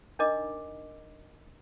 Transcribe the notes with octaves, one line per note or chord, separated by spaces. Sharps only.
D4 D#4 A#4 D#5 D6